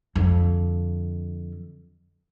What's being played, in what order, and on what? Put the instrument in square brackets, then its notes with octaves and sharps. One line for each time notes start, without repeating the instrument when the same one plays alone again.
[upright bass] F2 D3